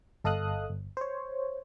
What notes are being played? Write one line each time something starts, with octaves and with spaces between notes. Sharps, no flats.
G1 A4 D#5 F5 D#6 F#6
G1
C5 C#5